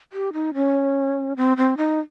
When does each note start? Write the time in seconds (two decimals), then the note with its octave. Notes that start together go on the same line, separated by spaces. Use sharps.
0.13 G4
0.33 D#4
0.54 C#4
1.37 C4
1.57 C4
1.77 D#4